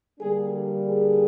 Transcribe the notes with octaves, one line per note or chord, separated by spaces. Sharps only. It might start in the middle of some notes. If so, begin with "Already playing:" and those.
D3 G3 A#3 D4 G#4
G#4